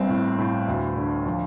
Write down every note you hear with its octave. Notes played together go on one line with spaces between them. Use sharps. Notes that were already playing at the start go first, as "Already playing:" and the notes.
Already playing: G1 C4
A2
A2
D2
D3
F3